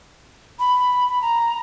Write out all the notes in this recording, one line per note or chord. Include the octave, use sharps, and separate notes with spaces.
B5
A#5